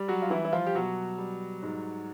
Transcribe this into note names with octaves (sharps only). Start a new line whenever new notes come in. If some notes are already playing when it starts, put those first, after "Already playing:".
Already playing: G3
F#3 F#4
F4
E3 G3 E4
E4
F3 F4
G4
B2 F#3 F#4
G3
G#2